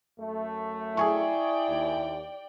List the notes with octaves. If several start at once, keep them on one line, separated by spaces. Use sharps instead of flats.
F#2 A3
E4 G#4 D5 G5 G#5 C#6
D#2